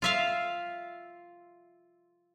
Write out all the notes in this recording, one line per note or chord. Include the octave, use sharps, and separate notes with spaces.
F4 E5 F5